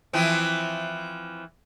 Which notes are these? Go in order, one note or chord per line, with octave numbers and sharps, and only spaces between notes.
E3 F3 C4